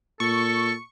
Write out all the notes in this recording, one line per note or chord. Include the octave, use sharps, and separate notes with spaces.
A#2 A4 C#6